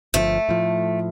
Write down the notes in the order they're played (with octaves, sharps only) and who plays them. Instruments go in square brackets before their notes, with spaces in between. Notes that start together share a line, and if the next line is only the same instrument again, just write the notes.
[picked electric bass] G1 B2 F3 [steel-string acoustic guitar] A3
[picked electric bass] A2 F3